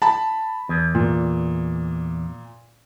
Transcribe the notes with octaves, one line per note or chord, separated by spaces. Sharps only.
A5 B5
E2
A#2